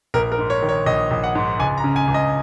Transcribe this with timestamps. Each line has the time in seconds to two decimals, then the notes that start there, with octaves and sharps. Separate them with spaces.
0.14 A#1 A#4
0.32 A#4
0.38 G#2
0.50 C#5
0.62 D#3
0.69 C#5
0.86 A#1 D#5
1.11 A#1
1.24 F#5
1.35 G#2
1.59 C#2 G#5
1.78 A#5
1.84 C#3
1.96 G#5
2.08 C#2
2.14 D#5